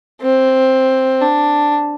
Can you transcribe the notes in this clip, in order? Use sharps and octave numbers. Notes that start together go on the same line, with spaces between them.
C4
D4